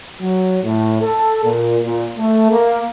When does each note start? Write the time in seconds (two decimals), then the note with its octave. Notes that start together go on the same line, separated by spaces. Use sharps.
0.21 F#3
0.64 A2
1.02 A4
1.44 A#2
1.84 A#2
2.18 A3
2.51 A#3